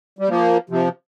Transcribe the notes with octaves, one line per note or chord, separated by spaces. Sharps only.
G3
F3 A#3
C3 F3